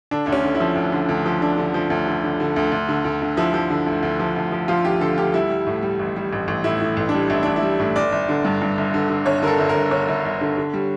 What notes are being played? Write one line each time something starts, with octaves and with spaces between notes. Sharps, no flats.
D3 D4
D2 D4
C#4
D3
E4
F3
D2
D3
D2
F3
D3 D4
D3
F3
D2
D3
D3
D3
D2
D2
D3
D2
D2
F3 E4
F3
D3
D2
D2
F3
D2
F3
F3 F4
D2 G4
D3 A4
D2 G4
G3 E4
G3
A2
G3
A1
G3
A1
A1
A2 E4
A2
A1
D4
G3
A1 E4
A1 D4
E4
G3
A2
G1 D5
G1
D3
G2
G2
G1
D3
D3
G1 C#5
D3 A4 A#4
G1
A#4
G1
G1 C#5
G1
G1
D3
D3
G3